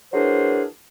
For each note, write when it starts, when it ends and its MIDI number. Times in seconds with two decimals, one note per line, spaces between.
0.13 0.64 52
0.13 0.64 54
0.13 0.64 62
0.13 0.64 68
0.13 0.64 70
0.13 0.64 72